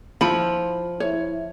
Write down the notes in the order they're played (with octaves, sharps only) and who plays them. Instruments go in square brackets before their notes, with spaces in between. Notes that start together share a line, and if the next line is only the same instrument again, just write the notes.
[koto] F3 [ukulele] E4 F4 B5
[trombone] E4 [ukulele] C#5